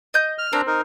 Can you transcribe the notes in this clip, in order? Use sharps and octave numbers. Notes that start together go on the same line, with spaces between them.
D#5 G6
F6
C4 D4 A#4 A#5
D#4 A#4